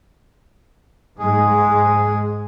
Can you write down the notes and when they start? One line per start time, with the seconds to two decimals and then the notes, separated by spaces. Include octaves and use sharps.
1.19 G#2 G#3 G#4